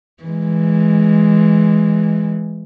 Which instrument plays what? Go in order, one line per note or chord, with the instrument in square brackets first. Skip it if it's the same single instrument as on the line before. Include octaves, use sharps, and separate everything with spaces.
[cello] E3 G#3